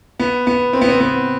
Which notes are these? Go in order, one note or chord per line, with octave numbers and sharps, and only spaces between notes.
B3
B3
C4
B3
C4
B3